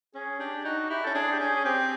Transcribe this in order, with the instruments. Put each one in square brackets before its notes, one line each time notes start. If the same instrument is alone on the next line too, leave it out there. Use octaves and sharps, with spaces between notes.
[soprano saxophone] C#4 [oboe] G#4
[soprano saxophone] D4 [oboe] G4
[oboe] G4
[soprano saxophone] D#4 [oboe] F#4
[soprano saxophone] E4 [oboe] G4
[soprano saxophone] C#4 [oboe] A4
[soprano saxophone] D4 [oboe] G#4
[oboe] G4
[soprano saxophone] C#4 [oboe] G#4
[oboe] G#4
[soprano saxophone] C4 [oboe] G4